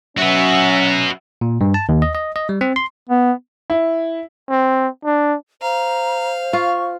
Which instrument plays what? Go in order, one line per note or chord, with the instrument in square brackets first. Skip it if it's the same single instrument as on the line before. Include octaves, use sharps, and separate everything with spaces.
[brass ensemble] F#3 C#4 [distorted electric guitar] F#4 B4 [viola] E5 F#5
[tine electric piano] A#2
G2
A5
D#2
D#5
D#5
D#5
G3
C4
C6
[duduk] B3
[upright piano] E4
[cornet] C4
D4
[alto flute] C5 [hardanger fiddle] F5 [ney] A#5
[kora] F4 [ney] C#6